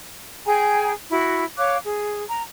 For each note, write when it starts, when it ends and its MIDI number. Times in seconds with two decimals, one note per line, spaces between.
0.46 0.92 68
0.46 0.92 79
0.46 0.92 80
0.46 0.92 82
1.09 1.43 64
1.09 1.43 66
1.58 1.77 73
1.58 1.77 77
1.58 1.77 86
1.58 1.77 90
1.85 2.24 68
2.29 2.43 82